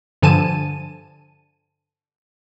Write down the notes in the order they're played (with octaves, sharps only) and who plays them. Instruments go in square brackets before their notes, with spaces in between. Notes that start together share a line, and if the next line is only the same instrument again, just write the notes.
[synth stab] G2 D3 F3 G#5 A5 D#7